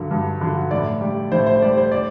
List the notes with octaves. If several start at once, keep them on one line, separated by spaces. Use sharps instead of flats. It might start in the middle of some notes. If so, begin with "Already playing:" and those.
Already playing: G2 D3 F#3
G2
D3 F#3
A2 D5
G3
A2 C5
C5
G3 D5
C5
D5